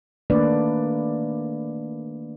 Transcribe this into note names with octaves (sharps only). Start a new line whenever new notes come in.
D#3 A3 A#3 D4 B4 D5